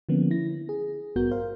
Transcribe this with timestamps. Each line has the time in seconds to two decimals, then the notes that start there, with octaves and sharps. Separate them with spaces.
0.09 D3 F3 A#3 B3 C#4
0.31 E4 A#6
0.69 G#4
1.16 A1 G2 B3 F#4 A#4 G6
1.31 A#4 C5 F5